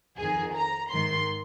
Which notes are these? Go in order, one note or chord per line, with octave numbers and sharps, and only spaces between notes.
F2 D#3 G#4
A#5
G#2 D#3 C6